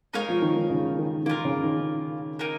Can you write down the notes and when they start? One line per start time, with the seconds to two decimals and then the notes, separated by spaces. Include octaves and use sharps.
0.13 G#3 D#4 A#4 C#5 F5
0.29 F3
0.42 D#3
0.56 D#3
0.70 C#3
0.99 D#3
1.26 D#3 A#3
1.29 F4 A#4
1.45 C#3
1.64 D#3
2.39 A#3 D#4 A#4